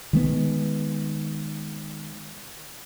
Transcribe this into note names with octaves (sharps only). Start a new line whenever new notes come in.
D#3 G#3 B3